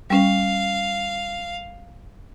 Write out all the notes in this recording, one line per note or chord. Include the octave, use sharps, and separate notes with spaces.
G3 C#4 F5